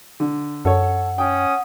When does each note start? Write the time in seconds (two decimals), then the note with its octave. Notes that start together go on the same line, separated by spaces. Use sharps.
0.20 D3
0.65 F#2 A4 C#5 F#5
1.18 C#4 G5 D#6